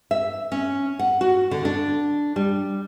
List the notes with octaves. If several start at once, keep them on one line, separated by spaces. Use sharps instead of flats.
E5
C#4
F#5
F#4
D3
D4
G3